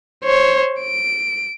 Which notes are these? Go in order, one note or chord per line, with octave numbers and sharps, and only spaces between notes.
C5 C#5
D7